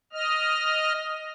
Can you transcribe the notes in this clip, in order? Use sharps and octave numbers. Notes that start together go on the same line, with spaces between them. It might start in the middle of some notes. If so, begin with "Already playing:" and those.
D#5 F6